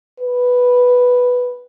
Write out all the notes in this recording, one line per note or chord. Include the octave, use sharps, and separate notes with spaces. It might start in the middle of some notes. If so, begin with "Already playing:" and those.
B4